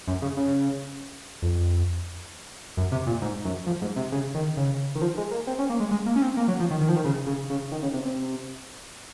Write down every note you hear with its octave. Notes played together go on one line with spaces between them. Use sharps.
F#2
C#3
C#3
F2
F#2
C3
A#2
G#2
F#2
F2
G#2
C3
C#3
D#3
C#3
D#3
F3
G#3
A#3
C4
C#4
A#3
G#3
G#3
A#3
C#4
C4
A#3
F#3
F3
D#3
D#3
F3
D#3
C#3
C#3
C#3
D#3
C#3
C3
C3